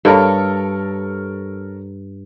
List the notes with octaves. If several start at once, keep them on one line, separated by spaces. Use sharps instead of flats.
G2 A4 A#4 C#5